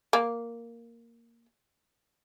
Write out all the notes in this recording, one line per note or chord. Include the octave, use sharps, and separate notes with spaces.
A#3